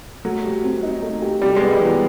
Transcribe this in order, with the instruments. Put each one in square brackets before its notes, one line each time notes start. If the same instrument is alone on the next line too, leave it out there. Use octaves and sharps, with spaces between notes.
[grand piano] F#3 [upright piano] A3
[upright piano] G4
C4
D#4
A3
G4
[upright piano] C3 [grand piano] G3
[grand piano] G#3 [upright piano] B3
[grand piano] G3
[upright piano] E3 [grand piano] F#3